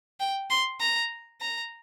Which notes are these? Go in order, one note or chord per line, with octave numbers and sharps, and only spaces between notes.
G5
C6
A#5
A#5